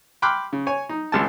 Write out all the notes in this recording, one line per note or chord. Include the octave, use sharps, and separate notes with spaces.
G5 B5 C6 D6 F6 F#6
C#3
C#5 G#5
D#4
G#1 C#2 A5